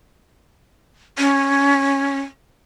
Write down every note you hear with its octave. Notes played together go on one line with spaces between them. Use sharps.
C#4